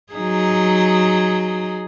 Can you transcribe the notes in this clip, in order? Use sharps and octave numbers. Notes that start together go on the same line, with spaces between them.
F#3 D#4 G#4